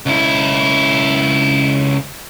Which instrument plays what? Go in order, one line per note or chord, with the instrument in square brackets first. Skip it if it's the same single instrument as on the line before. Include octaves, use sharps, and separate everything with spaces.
[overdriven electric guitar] C#2 E4